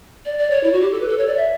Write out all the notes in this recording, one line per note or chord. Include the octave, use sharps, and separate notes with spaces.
D5
D5
C#5
E4
F#4
G4
A4
B4
A4
C#5
D5
E5